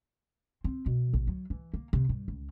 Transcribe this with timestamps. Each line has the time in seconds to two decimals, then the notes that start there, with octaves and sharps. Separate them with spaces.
0.64 C4
0.86 B2
1.13 A#1
1.27 F#3
1.50 E3
1.74 A#3
1.93 C3
2.09 G2
2.28 C#2